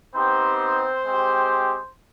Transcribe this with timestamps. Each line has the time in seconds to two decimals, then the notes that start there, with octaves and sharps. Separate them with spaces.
0.14 B3 C4 D#4 G4 C5
1.05 G#3 C4 G4